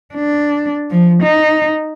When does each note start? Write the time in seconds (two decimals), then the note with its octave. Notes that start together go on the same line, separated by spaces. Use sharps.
0.14 D4
0.90 F3
1.23 D#4